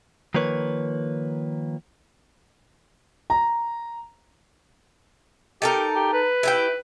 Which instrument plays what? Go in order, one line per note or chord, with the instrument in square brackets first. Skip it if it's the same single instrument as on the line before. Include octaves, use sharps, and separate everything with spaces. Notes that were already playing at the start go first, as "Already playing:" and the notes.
[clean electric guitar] D#3 F3 A#3 B4 C#5
[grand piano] A#5
[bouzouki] D#4 A4 A#4 [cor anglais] G4
[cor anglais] G4
B4
[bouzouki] E4 G4 G5